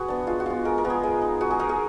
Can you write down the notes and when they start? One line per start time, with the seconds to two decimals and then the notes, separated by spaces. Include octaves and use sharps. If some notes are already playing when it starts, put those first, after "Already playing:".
Already playing: F#4 G#4 B4
0.08 B3 D4
0.27 G#3 F4
0.40 F#4
0.46 B3 F4
0.65 G#3 A#4
0.78 A#4
0.84 B3 F4
0.90 G#4
1.03 G#3
1.21 D#4
1.41 G#3 F#4
1.50 G#4
1.59 D#4 A#4
1.69 G#4